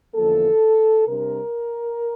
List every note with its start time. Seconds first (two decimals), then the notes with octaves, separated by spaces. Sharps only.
0.15 E2 D3 F3 A#3 A4
1.07 C3 G3 D4 A#4